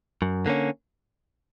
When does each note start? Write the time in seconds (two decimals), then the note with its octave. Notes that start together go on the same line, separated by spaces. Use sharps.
0.22 F#2
0.46 D3 A#3 C#4